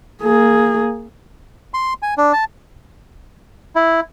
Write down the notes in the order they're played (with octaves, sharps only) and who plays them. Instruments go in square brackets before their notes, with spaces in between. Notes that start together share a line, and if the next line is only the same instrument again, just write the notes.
[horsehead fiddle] A#3 G#4
[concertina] C6
G#5
D4
A5
E4